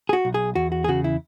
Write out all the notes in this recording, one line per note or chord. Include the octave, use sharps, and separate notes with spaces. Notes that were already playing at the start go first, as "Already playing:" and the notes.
G#4
F#4
B1
G#4
E2 F#4
F#4
G#4
C#3 F#4
E4